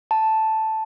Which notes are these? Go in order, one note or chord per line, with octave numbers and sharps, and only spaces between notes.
A5